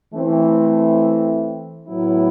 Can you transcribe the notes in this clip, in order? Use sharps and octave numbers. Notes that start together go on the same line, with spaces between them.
E3 A3 C4
A2 F#3 B3 E4